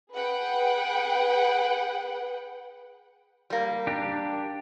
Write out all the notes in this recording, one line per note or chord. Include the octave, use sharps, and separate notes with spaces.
G#4 B4 F#5 G5
G3 A#3
D4 G4